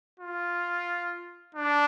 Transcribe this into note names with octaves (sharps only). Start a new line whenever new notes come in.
F4
D4